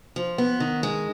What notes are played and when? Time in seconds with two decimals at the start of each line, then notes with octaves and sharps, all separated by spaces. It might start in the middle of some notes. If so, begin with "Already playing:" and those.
0.16 F3
0.38 B3
0.60 D#3
0.83 G#3